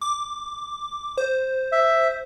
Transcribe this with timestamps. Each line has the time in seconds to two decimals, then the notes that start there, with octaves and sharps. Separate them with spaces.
0.01 D6
1.17 C5
1.72 E5